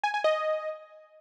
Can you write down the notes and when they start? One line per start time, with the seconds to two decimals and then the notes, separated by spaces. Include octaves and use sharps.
0.04 G#5
0.14 G#5
0.24 D#5